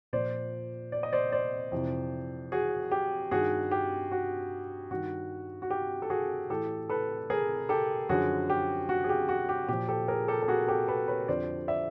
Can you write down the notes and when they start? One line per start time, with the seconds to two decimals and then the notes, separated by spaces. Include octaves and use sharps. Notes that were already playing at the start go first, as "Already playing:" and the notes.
0.13 A#2 F3 C5 D5
0.92 D5
1.03 D#5
1.13 C5 D5
1.32 C5 D5
1.72 F2 C3 E3
2.52 F#4 G#4
2.92 G4
3.31 G2 D#3 F#4 G#4
3.71 G4
4.12 F#4
4.91 G2 D#3 F#4
5.62 F#4
5.70 G4
6.02 A4
6.10 F#4 G#4
6.50 A2 E3 G4 A4
6.89 A4 B4
7.30 G#4 A#4
7.69 G4 A4
8.09 F#2 D3 F3 F#4 G#4
8.50 G4
8.89 F#4
9.04 G#4
9.09 G4
9.29 F#4
9.49 G4
9.68 A#2 F3 G4
9.89 G4 A4
10.08 G#4 A#4
10.28 G4 A4
10.42 A4
10.48 F#4 G#4
10.68 G4 A4
10.88 A4 B4
11.08 B4 C#5
11.28 F2 D3 F3 C5 D5
11.68 D5 E5